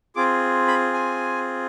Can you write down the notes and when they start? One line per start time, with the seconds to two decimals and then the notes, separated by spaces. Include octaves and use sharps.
0.16 C4 F4 G#4 D6
0.67 B5
0.93 G#5